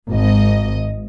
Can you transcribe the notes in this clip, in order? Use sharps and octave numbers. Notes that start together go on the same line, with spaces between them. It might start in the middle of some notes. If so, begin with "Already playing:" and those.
G#1 D#5